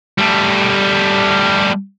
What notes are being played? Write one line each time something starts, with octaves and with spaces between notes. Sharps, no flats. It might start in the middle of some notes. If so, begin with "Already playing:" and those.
G3 A3